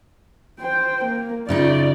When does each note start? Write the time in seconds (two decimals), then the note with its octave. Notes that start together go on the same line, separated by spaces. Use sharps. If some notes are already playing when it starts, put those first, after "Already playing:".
0.59 C5 G5
1.05 A#3
1.49 F#2 C#3 D#4 F4 D5